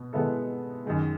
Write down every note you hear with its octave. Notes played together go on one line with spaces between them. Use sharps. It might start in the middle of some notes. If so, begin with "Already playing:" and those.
Already playing: B2 B3
B2 G#3 B3 E4 A4
F#2 D#3 G#3